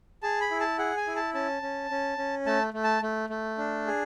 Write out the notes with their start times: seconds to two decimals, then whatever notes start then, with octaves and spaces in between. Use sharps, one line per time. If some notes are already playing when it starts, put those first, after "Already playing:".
0.23 G#4 A5
0.41 B5
0.51 E4
0.60 A5
0.78 G#4 F#5
0.97 G#5
1.07 E4
1.16 A5
1.34 C#4 A5
1.62 C#4
1.90 C#4
2.18 C#4
2.46 A3 A5
2.74 A3
2.84 A5
3.02 A3
3.30 A3
3.58 D4
3.86 G#4